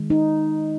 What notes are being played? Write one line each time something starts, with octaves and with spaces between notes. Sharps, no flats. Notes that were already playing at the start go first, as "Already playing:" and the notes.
Already playing: D#3 G#3
D#4